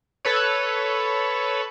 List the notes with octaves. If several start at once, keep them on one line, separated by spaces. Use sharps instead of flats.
A4 B4 C#5